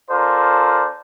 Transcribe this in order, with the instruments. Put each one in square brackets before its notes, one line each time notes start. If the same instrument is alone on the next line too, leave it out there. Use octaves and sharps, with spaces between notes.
[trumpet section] C#4 F4 A4 A#4 C5 D5